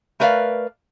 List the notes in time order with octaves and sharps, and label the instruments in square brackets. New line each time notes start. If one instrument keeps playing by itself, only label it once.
[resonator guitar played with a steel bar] A3 A#4 B4 D5 F5